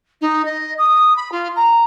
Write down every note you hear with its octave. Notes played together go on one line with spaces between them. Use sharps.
D#4
D#5
D#6
B5
F4
A#5